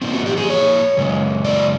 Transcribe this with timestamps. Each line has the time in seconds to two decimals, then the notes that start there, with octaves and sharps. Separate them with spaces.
0.02 A#2 F3 A#3 C4
0.14 F#4
0.26 G4
0.37 G#4
0.50 C#5
0.97 F#2 C#3 G#3
1.44 D5